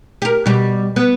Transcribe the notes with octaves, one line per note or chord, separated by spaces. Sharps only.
G4 A#4
B2 G3
B3